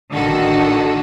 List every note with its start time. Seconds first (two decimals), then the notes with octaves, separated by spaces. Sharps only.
0.14 A1 D3 D#3 F#4 A4